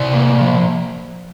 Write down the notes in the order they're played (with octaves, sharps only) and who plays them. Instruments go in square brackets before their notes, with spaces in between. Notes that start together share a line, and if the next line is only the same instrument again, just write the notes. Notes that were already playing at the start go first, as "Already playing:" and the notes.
Already playing: [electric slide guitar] C3 D5
A#3
F3